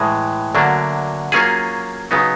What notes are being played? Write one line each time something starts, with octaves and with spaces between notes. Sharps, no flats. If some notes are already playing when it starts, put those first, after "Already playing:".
Already playing: A2 E3 G#3
D2 D3 F#3 A#3 D4
F#3 A#3 C#4 F4 G#4
C#3 F#3 B3 D#4